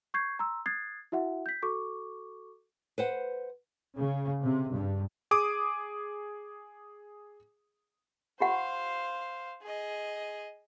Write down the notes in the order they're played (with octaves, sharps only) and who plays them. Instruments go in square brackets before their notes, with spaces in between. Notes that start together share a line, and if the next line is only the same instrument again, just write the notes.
[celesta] C#6 G6 G#6 C7
A#5 C6 E6
D#6 F#6 G#6 A6 C7
E4 F#4 E5 F#5
G6 B6
F#4 A4 C#6 D6
[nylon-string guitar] B4 C5 F#5
[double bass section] C#3
C3
G2
[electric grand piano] G#4 D6 D#6
[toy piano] F4 G4 F#5 [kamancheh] C5 F5
[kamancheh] G#4 D#5